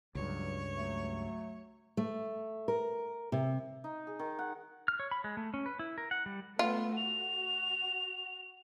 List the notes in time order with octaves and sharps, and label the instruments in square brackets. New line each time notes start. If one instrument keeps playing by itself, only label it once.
[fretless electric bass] C#2 G2 [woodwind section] F#3 [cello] C#5
[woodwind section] F#3 A3
[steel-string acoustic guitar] A3
A#4
C3
[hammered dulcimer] D#4
G#4
D#3
F#5
[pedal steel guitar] F6
C#5
B5
G#3
A3
C#4
B4
E4
A#4
F#5
G3
[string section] A3 B3 [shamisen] F4
[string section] F#4 [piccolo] F7